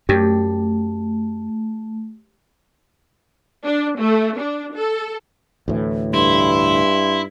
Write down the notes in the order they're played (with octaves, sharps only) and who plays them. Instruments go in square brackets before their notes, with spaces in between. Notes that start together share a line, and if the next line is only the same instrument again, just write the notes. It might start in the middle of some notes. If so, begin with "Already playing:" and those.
[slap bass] F#2 [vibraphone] A3 [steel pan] G4
[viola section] D4
A3
D4
A4
[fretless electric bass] D2 A2 E3
[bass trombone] G2 [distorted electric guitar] E4 [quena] C6